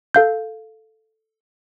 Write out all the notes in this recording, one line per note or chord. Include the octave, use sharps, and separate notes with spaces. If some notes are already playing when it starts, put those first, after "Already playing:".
A4 F5 G6